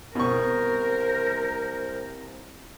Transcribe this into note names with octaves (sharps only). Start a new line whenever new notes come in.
C2 B2 A#4 C5 C#6